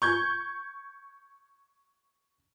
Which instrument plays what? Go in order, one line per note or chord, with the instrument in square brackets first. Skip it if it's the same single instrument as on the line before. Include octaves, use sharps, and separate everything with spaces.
[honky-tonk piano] C#6 G6 G#6